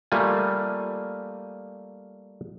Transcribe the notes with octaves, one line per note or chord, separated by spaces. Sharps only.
G3 A3 A#3 F4 G#5